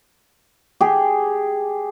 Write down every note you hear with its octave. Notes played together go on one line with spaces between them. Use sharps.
G4 G#4